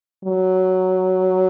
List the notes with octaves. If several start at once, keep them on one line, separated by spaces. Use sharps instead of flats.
F#3